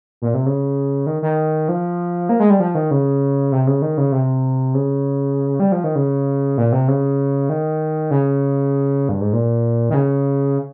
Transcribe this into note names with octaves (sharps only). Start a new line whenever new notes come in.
A#2
C3
C#3
D#3
D#3
F3
A#3
G#3
G3
F3
D#3
C#3
C3
C#3
D#3
C#3
C3
C#3
G3
F3
D#3
C#3
A#2
C3
C#3
D#3
C#3
G2
G#2
A#2
D#3
C#3